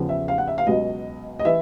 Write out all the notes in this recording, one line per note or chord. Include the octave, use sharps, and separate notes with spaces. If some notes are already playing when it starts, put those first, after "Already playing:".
Already playing: E2 C#3 F3
E5
F5
F#5
E5
F5
C#2 B2 F#3 D#5
D#5
E3 E5